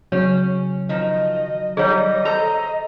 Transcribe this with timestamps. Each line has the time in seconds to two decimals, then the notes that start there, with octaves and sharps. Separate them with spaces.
0.12 C#3 F#3 C#4 C#5
0.89 D#3 F3 D#5
1.77 D#3 G3 G#4 C#5 D#5
2.25 A4 C5 A#5